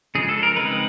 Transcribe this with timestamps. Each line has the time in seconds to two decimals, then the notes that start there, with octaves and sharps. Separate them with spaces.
0.15 C#3 F3 G#3 G#4
0.29 A4
0.43 A#4
0.56 G#3 C4 D#4 B4